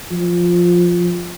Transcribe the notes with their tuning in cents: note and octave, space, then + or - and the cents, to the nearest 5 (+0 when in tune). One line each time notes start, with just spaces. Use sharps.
F3 +5